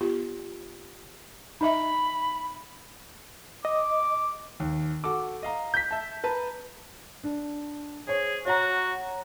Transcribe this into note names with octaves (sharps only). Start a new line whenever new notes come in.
B3 F4 G4
D#4 D#5 E5 B5
D#5 D6
D#2
F#4 A4 D6
D#5 F5 A#5
G6 B6
E5 A5
B4 A5 A#5
D4
G#4 C5 C#5
F#4 C#5 F#5 A#5